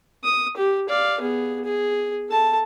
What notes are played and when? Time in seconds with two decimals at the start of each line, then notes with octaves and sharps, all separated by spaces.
0.24 D#6
0.57 G4
0.89 D5 F5
1.20 B3 G#4
1.65 G#4
2.29 A4 A5